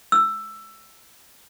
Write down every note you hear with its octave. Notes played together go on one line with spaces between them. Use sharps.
E6